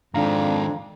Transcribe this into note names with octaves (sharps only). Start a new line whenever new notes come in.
F2 G#2 D#3 G#3 D4 F5 A#5